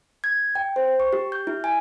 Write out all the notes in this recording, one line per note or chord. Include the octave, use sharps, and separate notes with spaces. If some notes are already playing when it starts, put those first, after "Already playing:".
G#6
G5
C5
C#6
G4
G6
E4
G#5